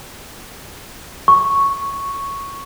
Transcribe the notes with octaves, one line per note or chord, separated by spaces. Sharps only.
C#6